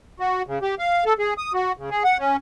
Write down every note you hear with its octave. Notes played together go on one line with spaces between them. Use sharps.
F#4
C#3
G4
F5
A4
G#4
D#6
F#4
C#3
G#4
F#5
C#4